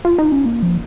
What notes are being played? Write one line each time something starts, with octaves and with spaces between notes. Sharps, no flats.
F4
D#4
C#4
A#3
F3